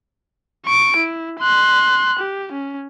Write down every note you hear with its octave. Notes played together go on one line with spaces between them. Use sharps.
C#6 D7
E4
C6 F#6
G4
C#4